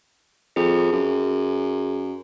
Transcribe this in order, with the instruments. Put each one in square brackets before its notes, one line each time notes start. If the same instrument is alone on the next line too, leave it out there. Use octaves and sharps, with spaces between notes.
[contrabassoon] F2 [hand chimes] G#4
[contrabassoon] F#2